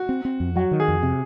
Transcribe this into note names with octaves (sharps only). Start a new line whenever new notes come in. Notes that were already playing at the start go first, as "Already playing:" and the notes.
Already playing: F#4
C4
C4
F2
F#3 F#4
D#3
G#4
F2
C3